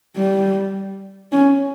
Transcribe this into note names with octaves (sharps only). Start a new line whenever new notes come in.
G3
C#4